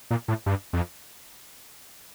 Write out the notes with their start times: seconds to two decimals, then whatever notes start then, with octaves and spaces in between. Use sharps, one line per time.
0.11 A#2
0.28 A2
0.46 G2
0.73 F2